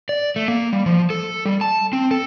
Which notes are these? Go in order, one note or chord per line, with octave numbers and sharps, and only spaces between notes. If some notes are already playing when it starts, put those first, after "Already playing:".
D5
A3
A#3
G3
F3
A4
G3
A5
C4
A4